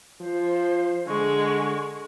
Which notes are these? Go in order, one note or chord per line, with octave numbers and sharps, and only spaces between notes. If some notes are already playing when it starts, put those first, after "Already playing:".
F3 C5
D3 G#3 C#6